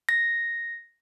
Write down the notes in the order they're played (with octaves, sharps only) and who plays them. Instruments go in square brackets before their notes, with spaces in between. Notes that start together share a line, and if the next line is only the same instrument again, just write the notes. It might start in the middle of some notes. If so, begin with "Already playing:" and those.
[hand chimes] A#6